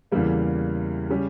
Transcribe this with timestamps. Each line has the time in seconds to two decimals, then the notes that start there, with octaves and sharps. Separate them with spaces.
0.12 E2 C#3 E3 G3 A#3
1.10 C#3 G3 C#4 G4